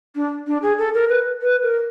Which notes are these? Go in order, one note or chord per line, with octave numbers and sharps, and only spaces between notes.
D4
D4
G#4
A4
A#4
B4
B4
A#4